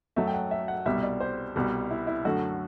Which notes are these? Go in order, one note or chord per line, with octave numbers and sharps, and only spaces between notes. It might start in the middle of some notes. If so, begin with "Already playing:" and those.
F#2 F#3 A3 E5
G5
F#5
E5
F#5
C2 B2 G3 E5
D5
C5
C2 B2 G3
E4
E4
F#2 D3 A3 F#4